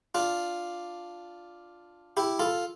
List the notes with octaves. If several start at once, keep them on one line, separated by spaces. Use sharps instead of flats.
D4 F4
E4 G4
F4 A4